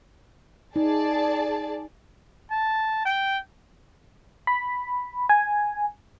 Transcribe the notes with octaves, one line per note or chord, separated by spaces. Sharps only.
D#4 G#4 D5 A5
A5
G5
B5
G#5